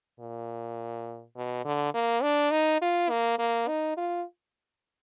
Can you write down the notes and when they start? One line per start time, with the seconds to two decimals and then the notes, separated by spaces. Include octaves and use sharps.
0.20 A#2
1.37 B2
1.64 D3
1.94 A#3
2.22 D4
2.51 D#4
2.82 F4
3.10 A#3
3.39 A#3
3.68 D#4
3.97 F4